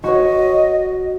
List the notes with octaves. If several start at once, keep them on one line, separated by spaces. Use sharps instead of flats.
F#4 C#5 D#5